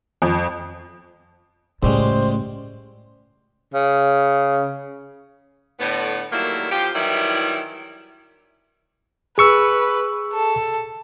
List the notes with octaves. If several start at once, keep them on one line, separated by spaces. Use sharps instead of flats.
F2
C#2 A2 G3 G#3 C5
C#3
A2 D3 B3
D#3 F#3 G3 A3 A#3 E4
F3 C4 F4 G4
D#3 E3 F#3 G3 E4
G#4 B4 C#6 E6
A4